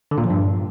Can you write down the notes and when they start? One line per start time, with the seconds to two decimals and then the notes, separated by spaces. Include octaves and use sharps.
0.11 D3
0.18 A#2
0.24 F3
0.30 G2